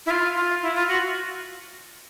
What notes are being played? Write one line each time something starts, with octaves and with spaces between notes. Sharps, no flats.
E4
F4
F4
E4
F4
F#4